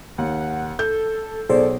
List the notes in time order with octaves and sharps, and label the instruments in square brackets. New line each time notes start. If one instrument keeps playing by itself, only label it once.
[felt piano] D#2 [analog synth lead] F#5
[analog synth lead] A4 [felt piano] G6
[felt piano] B1 [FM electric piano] G#4 C5 D5 [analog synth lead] A4